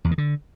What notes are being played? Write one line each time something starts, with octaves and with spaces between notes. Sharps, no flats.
E2
D#3
D3